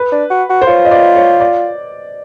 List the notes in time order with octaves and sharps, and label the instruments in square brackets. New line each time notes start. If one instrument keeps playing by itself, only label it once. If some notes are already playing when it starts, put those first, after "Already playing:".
Already playing: [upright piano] B4
[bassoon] D4
F#4
F#4
[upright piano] C5
[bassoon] F4 [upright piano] C#5
[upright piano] D#5
D5
C#5
D5